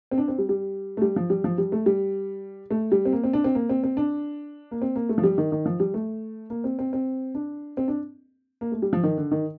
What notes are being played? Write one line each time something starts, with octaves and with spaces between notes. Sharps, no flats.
C4
D4
C4
G3
G3
A3
G3
F3
G3
F3
G3
A3
G3
A3
G3
C4
A#3
C4
D4
C4
A#3
C4
C4
D4
A#3
C4
A#3
A3
F3
G3
D#3
D#3
F3
G3
A3
A#3
C4
C4
C4
D4
C4
D4
A#3
A3
G3
F3
D#3
D3
D#3